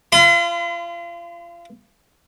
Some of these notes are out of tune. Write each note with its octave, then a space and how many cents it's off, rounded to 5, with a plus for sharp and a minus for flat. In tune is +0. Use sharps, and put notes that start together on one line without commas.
F4 -30 C6 -45